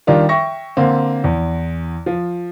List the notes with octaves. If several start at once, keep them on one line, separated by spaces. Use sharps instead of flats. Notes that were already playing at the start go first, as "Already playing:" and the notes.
D#3 G3 D4 F4 A#4
E5 G5 C#6 A#6
D3 A#3 C4
E2
F3